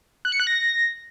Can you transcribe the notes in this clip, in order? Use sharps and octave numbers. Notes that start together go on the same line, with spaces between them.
F#6
C#7
F#6
A#6